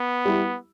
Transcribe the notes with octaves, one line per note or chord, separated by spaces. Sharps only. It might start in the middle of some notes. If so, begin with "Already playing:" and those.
Already playing: B3
G3 E4